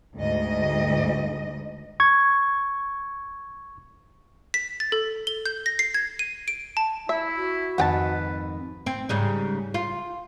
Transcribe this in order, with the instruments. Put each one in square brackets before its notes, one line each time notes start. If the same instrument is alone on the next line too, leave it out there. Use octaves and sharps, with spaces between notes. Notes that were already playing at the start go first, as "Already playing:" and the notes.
[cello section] D2 G#2 D#5
[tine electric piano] C#6 G#6
[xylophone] B6
A6
A4
G7
G6
A#6
C7
G#6
D#7
D7
A5
[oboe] E4 [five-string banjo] E5
[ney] F#4
[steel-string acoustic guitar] F2 G#2 D#3 [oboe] B4 [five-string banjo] F#5 G5 A5
[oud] C4
G#2 C#3 G3
F4